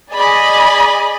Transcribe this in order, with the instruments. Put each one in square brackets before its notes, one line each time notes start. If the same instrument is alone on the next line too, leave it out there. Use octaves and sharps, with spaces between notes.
[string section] G#4 D5 D#5 G#5 B5